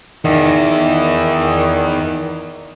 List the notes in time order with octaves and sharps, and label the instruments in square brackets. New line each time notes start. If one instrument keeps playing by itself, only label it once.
[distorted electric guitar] E2 [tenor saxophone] D#3